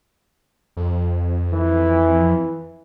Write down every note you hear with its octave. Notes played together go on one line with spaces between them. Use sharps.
F2
E3